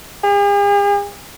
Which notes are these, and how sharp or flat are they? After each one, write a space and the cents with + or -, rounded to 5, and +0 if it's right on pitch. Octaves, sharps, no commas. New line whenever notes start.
G#4 -45